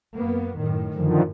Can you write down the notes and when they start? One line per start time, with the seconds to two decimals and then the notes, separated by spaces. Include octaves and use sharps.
0.16 F#2 A#3 B3
0.59 F#2 A2 D#3
0.94 F#2 D3 D#3 F3